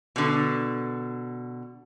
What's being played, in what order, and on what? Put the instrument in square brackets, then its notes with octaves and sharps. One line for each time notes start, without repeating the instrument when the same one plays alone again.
[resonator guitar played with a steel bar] B2 D3